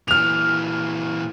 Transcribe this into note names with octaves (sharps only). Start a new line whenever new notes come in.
A#2 E3 F6 F7